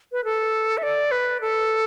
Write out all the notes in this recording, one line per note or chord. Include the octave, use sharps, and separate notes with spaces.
B4
A4
E5
D5
B4
A4